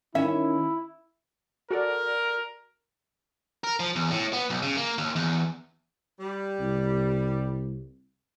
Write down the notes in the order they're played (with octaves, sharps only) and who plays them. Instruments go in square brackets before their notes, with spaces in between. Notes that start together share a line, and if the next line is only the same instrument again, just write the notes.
[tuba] D#3 [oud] C#4 [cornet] E4 [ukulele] E5
[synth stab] F#4 A4 D5 [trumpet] A#4
[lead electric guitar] A#4
F3
E2
A2
B3
B1
C#3
A#3
D#2
E2
[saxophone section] G3
[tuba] C2